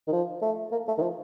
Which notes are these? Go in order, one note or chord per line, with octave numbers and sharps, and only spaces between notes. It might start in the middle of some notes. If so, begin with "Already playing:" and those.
D#3
F3
A3
A#3
A3
D#3
F3